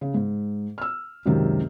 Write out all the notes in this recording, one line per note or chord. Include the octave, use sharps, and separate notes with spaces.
C#3
G#2
E6 F6
C#2 F#2 C3 D#3